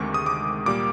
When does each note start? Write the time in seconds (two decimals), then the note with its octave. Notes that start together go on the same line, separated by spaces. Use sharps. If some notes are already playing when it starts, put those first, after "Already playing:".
Already playing: D2 C3 D#3 G#3 C#6 D6
0.14 D#6
0.26 D6
0.66 A#2 G3 A#3 D6